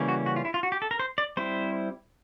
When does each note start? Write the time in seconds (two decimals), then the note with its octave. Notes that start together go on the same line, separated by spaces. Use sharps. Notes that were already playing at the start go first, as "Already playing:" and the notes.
Already playing: C#3 E3 G3 A#3 C#4
0.08 F#4
0.26 F#4
0.36 F4
0.45 E4
0.54 F4
0.63 F#4
0.72 G4
0.82 A4
0.91 A#4
0.99 C5
1.18 D5
1.37 G3 C4 E4 C5